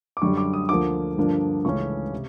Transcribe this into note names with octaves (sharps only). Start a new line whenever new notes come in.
D6
F#2 D3 G3 C#6
D6
D#6
D2 D3 F3 A#3 D6
G2 D3 F3 A#3 D4
C#2 C#3 E3 A3 C#4 C#6
C3